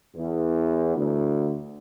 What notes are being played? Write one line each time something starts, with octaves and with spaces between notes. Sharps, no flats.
E2
D2